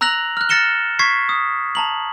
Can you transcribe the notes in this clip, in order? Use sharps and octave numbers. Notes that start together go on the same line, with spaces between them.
A#5 E6 F#6 A#6 F7 F#7
F6 F#6
F6 A6 A#6 C#7 E7 G7
C#6 G#6 B6 C7
D#6
A5 A#5 F#7